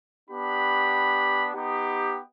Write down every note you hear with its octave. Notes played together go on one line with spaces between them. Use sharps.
B3 D4 G4 B5
B3 D#4 G4